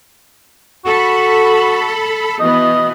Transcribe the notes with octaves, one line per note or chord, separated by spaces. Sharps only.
F#4 A4 B5
B2 E3 B3 D#5